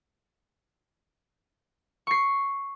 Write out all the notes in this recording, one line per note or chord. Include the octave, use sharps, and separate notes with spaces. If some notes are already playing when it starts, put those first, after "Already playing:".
C#6 C7